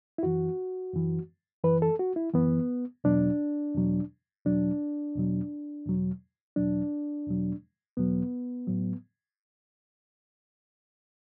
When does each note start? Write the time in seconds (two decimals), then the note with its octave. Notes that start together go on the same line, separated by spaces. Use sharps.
0.18 E4
0.23 F#2 E3 F#4
0.93 F#2 E3
1.64 F#2 E3 B4
1.82 A4
1.99 F#4
2.16 E4
2.34 F#2 E3 B3
3.04 E2 B2 F#3 D4
3.74 E2 B2 F#3
4.45 E2 B2 F#3 D4
5.16 E2 B2 F#3
5.86 E2 B2 F#3
6.56 E2 B2 F#3 D4
7.27 E2 B2 F#3
7.97 E2 B2 F#3 B3
8.67 A2 F#3